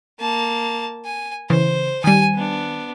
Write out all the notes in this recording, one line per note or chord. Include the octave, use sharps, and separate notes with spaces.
A#3 A5
G#5
C#3 E3 C5
D#3 G3 G#5
B3 D4